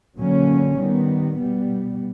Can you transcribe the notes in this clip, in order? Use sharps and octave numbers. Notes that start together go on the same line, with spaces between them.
D3 F#3 A#3 C#4
D#3 G3 B3
B2 G3 B3